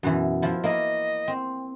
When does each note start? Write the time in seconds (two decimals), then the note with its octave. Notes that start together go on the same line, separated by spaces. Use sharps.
0.03 F#2 B2 E3
0.42 F3 E4
0.64 A#3 E4 D#5
1.28 C4